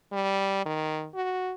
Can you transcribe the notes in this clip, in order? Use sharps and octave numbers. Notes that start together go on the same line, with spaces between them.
G3
D#3
F#4